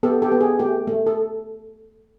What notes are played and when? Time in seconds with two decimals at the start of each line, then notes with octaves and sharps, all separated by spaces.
0.03 B3 G4 A4
0.22 G4 A4
0.32 B3
0.41 G#4
0.59 A3 G4
0.87 A3
1.07 A4